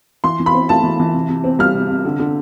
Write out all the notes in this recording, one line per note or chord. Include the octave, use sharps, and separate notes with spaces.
E3 C6
E3
B5
C4
A3 A5
E3
E3
C3
C3
C4
G3 F6
C3
C3
D3
D3